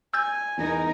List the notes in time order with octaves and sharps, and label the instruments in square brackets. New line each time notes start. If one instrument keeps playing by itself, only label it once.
[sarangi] G#5 [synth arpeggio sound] E6 G6 A6
[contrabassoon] E2 [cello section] D#4 A#4